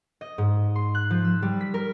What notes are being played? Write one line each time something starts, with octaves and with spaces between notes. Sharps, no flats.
D#5
G#2
C6
F#6
F3
E6
G3
B6
A#4